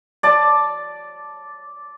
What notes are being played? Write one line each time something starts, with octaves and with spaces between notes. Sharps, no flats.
D5 A5